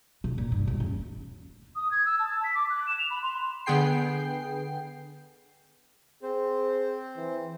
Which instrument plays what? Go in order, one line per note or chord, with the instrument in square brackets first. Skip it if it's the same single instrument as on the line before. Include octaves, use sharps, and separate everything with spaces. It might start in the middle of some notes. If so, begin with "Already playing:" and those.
[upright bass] B2
A#2
G2
D#2
C#4
[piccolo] D#6
G#6
E6
A5
B6
D6
F#6
E7
F7
B5
C6
[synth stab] D3 B3 G#4 G5 C7
[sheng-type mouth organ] C4 C5 [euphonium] G#4
[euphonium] E3